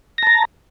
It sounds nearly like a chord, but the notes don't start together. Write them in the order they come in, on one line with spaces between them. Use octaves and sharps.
A#6 A5 A#5